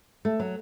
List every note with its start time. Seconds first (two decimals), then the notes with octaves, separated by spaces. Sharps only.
0.25 A3
0.40 F#3